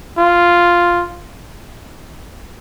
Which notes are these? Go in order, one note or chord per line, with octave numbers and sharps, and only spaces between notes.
F4